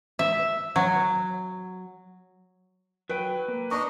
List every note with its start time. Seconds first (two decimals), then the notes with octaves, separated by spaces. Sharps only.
0.19 E5
0.76 F#3
3.09 F#3 B4 G5
3.48 A#3
3.71 D4 D#4 D#5 C#6